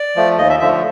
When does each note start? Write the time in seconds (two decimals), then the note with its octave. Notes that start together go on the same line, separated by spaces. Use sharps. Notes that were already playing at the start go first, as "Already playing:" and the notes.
Already playing: D5
0.16 F3 A3
0.37 D#2 D#5
0.50 E5
0.60 D3 F3 A3 E5